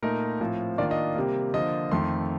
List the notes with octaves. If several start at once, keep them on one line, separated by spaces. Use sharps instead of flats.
A#2 A3 D#4 A#4
A2 F3 C4 F4
D#3 A#3 D4 F4 D5
D#5
C3 G3 A#3
D3 F3 A#3 F4 D#5
F2 D#3 A3 C6